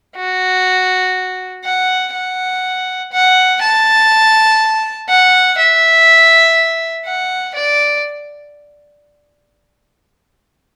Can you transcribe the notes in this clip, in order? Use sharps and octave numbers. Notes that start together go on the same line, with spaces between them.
F#4
F#5
F#5
F#5
A5
F#5
E5
F#5
D5